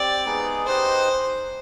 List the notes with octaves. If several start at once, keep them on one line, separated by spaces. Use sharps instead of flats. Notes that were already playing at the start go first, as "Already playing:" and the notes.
Already playing: C4 G4 D5
G#3 B3 D#4 G#4
D#4 G4 B4 C5 D#5